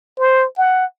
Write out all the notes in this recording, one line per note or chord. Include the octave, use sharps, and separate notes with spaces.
C5
F#5